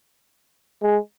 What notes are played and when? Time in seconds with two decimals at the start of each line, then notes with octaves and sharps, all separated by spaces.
0.82 G#3